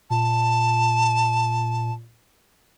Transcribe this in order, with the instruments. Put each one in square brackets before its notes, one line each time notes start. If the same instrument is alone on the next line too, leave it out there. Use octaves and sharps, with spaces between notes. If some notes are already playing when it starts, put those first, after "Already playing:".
[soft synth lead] A#2 [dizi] A5